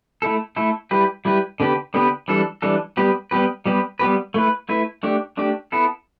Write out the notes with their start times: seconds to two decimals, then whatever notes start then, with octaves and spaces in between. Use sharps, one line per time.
0.22 A3 E4 A4
0.56 A3 E4 A4
0.91 G3 E4 G4 B4
1.25 G3 E4 G4 B4
1.60 D3 B3 G4 B4
1.94 D3 B3 G4 B4
2.28 E3 G3 D4 A4
2.62 E3 G3 D4 A4
2.97 G3 B3 G4 B4
3.31 G3 B3 G4 B4
3.66 G3 B3 G4 B4
3.99 G3 B3 G4 B4
4.34 A3 E4 B4
4.69 A3 E4 B4
5.03 A3 D4 G4
5.37 A3 D4 G4
5.72 B3 E4 A4